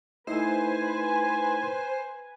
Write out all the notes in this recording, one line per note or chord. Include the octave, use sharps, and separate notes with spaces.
A3 D#4 E4 B4 C5 G#5